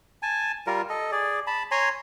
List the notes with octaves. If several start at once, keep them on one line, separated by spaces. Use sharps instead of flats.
G#5 A5
G3 F4 A#4
A4 D#5
G#4 D5
A5 B5
C#5 G#5 A#5 C6